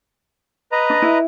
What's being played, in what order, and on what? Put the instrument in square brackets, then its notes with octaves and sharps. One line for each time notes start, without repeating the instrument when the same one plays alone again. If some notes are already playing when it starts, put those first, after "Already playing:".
[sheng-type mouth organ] B4 D#5 A#5
[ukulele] D4
E4